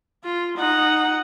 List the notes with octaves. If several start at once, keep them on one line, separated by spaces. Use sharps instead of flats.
F4
D#4 F#5